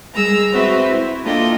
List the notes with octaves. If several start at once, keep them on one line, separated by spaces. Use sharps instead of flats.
G3 G#3 G#4 A#5 E6
C4 F#4 B4 C5 E5
E4
A#3 D4 F4 A4 D#5 G5